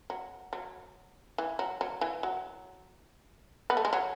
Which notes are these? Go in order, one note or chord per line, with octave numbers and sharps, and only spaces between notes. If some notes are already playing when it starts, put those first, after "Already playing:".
F#3
F#3
E3
F#3
F#3
E3
F#3
B3
A3
G#3
F#3